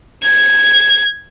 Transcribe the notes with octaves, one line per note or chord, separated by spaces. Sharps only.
G#6